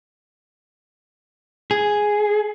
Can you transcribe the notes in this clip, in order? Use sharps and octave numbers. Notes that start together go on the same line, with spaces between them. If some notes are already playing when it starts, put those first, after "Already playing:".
G#4